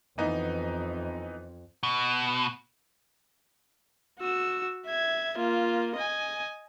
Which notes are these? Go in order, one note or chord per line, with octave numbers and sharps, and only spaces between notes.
F2 E3 B3 D#4
B2
F#4 E6
E5 G#6
A#3 F4
D#5 G#5